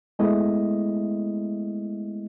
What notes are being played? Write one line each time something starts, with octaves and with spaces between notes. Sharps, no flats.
G#3 A3 B3 E4 D#5